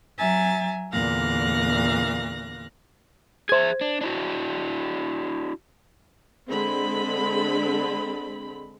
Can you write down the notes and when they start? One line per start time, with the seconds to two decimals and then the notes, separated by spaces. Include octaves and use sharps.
0.18 F#3 E5 G#5 A#5 A6
0.92 E2 A#2 D3 F5 F#6 A#6
3.49 G#4 C5 E5 G#6
3.81 D4
4.01 D4 E4 F#4
6.50 D3 G#3 C4 B5